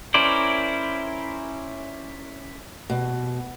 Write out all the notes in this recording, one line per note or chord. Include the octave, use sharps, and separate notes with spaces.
C#4 E4 A#4 C5 D5
B2